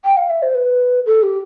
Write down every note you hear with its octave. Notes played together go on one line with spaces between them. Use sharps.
G5
F5
E5
C5
B4
A4
G4